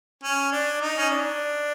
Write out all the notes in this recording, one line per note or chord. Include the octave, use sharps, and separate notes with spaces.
C#4
D4
D#4
C#4
D4